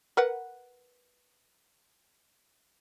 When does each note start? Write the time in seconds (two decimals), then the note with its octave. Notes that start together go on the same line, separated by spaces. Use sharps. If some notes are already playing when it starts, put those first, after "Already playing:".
0.17 A#4 B4 F#5